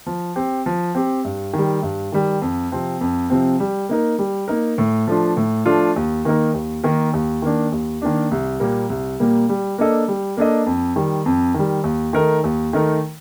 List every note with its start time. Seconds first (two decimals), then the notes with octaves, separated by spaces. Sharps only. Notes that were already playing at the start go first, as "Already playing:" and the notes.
0.06 F3
0.35 C4 G4
0.66 F3
0.95 C4 G4
1.25 G2
1.53 D#3 G3
1.83 G2
2.12 D#3 G3
2.42 F2
2.72 C3 F3 C4
3.01 F2
3.30 C3 F3 C4
3.60 G3
3.89 A#3 D#4 A#4
4.19 G3
4.48 A#3 D#4 A#4
4.78 A2
5.07 F3 A3 D4 F4
5.37 A2
5.65 F3 A3 D4 F4
5.96 D#2
6.25 D#3 A#3 D#4 A#4
6.54 D#2
6.84 D#3 A#3 D#4 A#4
7.13 D#2
7.42 D#3 A#3 D4
7.72 D#2
8.02 D#3 A#3 D4
8.31 C2
8.60 A#2 G3 A#3
8.90 C2
9.20 A#2 G3 A#3
9.49 G3
9.78 A#3 D4 A4 D#5
10.08 G3
10.37 A#3 D4 A4 D#5
10.66 F2
10.96 D#3 G3
11.26 F2
11.54 D#3 G3
11.84 D#2
12.13 D#3 A3 D#4 A#4
12.44 D#2
12.73 D#3 A3 D#4 A#4